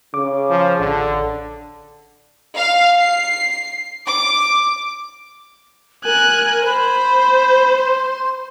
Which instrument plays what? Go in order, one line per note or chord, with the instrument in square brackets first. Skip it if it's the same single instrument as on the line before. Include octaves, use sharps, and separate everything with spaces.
[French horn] C#3 [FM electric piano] D6
[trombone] F3
[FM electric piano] A1 [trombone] D3
[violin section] F5
C7
D6
[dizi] A#4 [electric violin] G#5 F#6
[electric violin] C5 [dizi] B5
[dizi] C6